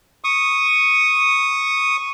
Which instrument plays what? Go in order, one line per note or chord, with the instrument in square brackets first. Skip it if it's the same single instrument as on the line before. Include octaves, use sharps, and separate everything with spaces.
[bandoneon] C#6 D#6